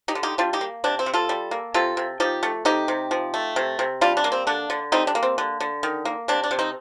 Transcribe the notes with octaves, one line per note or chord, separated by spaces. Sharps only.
D#4 G4
D3
D#4 G4
G3 D4 F4
D#4 G4
A#3
C3 D4
C4
C3
F4 A4
G3
A#3
C3 F4 A4
C3
F3 D#4 G4
A3
C3 D#4 G4
C3
F3
A3
C3
C3
G3 D4 F4
D4
A#3
C4
D3 D4
D3
G3 C4 D#4
D4
A#3
C4
D3
D3
D#3
A#3
C3 D4
D4
C3
C4 D#4